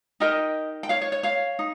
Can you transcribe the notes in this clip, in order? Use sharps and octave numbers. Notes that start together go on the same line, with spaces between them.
D#4 G4 A#4 D#5 G5
G5
C#5 F5
C#5
C#5
C#5 F5
D#4